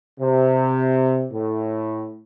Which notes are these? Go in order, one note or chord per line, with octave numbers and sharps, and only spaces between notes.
C3
A2